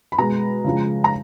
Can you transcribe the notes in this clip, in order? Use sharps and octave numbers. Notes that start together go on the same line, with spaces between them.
B5
B2 G#3 A#5
C#3 F3 G#3
A#5